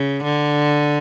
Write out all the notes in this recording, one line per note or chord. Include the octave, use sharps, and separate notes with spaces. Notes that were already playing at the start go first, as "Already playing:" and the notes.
Already playing: C#3
D3